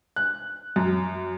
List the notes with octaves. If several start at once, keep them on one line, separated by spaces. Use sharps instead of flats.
F#6
F#2